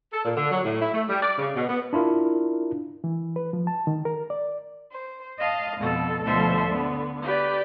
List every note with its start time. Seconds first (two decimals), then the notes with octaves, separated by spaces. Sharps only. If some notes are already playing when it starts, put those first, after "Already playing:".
0.12 A4
0.24 A#2
0.36 D3
0.51 F#3
0.64 A2
0.81 E4
0.93 A3
1.09 G3
1.22 D5
1.38 C#3
1.55 B2
1.69 B3
1.93 D4 E4 F4 A#4
3.04 E3
3.36 B4
3.53 F3
3.67 A5
3.87 D#3
4.05 A#4
4.30 D5
4.91 C5
5.37 D#5 F5 A5
5.77 F2 B2 A4
6.22 D2 B2 F3 A4 C5 E5
6.68 D3 B3
7.22 G4 B4 D5